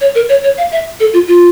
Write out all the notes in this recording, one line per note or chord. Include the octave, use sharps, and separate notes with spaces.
C#5
A#4
C#5
C#5
F5
E5
A4
F4
F4